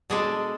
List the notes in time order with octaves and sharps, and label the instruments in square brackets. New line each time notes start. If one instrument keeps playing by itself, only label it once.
[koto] B2 G#3 D4 A4